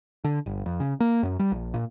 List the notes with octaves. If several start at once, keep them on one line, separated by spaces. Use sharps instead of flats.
D3
G1
F2
C#3
A#3
F#2
G3
A#1
A#2